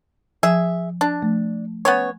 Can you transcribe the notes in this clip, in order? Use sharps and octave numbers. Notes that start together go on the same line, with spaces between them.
F3 G#4 E5
D4
F3 A3
B3 C#4 C#5